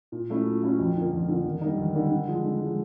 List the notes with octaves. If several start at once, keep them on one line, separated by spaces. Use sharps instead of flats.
A#2
F#3 A3 C#4 E4
A#2
F#3 A3 C#4 E4
F2
D3 F3 A#3
F2
D3 F3 A#3
D#2
D3 G3 A#3 D#4
D#2
D3 G3 A#3 D#4
D3
F3 G#3
D3
F3 G#3